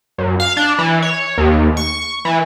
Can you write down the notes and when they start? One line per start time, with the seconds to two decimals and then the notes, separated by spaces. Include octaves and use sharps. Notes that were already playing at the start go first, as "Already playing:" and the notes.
0.18 F#2
0.40 F5
0.57 D4
0.79 E3
1.02 C#5
1.38 D#2
1.77 C#6
2.25 E3